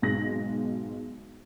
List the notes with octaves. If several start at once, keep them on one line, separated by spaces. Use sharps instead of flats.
B1 G#2 B2 G#3 A#6 F#7